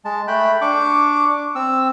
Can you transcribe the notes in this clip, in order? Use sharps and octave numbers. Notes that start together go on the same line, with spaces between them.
G#3 A5
A3 G5 B5 F#6
D4 C#6 D6
C4 E6